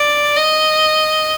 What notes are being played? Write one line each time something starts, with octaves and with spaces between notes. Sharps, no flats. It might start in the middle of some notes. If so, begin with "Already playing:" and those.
Already playing: D5
D#5